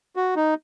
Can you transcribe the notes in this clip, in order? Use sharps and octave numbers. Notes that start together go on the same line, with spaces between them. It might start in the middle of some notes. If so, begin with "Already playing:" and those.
F#4
D#4